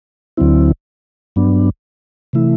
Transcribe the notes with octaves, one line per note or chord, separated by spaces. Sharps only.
D2 D3 F#3 C4 E4
G2 F#3 B3 D4
C3 E3 A3 E4